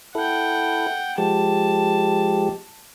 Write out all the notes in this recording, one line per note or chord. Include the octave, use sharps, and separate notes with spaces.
E4 A4 F#5 G5
F3 G#3 G4 A5